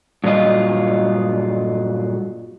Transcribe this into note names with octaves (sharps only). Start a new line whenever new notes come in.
G2 A#2 F#3 F4 D#5